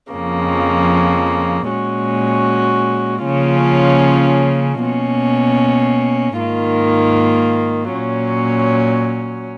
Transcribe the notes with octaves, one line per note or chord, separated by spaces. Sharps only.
F2 C#3 F3 A#3
A#2 G#3 C#4 F#4
C#3 F3 A#3 C#4 F4
B2 A#3 C#4
G#2 D#3 A#3 F4
A#2 F#3 C#4